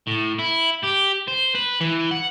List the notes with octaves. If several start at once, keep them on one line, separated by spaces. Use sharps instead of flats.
A2
E4
G4
C5
B4
E3
F#5